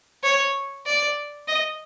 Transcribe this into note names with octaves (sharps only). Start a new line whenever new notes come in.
C#5
D5
D#5